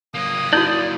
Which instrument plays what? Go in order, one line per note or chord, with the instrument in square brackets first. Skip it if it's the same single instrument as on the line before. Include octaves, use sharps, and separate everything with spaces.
[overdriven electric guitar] F#3 A#3 [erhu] D#6
[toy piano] D#4 E4 F#4 [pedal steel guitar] D5 G6